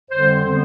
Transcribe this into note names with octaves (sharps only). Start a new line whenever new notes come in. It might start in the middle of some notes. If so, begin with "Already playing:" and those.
F2 D3 G3 C4 C5
D3 G3 B3